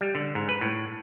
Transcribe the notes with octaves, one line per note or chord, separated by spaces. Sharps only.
G3
D3
G#2
B4
A2